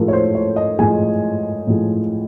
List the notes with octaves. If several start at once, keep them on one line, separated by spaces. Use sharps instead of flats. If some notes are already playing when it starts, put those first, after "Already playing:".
Already playing: A2 F3 G#3 A4 A#4
C#5
C5
C#5
D#5
A2 F3 G#3 G#5
A2 F3 G#3